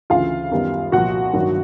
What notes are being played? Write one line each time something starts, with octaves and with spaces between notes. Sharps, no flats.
D2 C#3 E3 F4 F5
F#2 D#3 G3 B3
C2 A#2 F3 F#4 F#5
A1 G2 D#3 F#3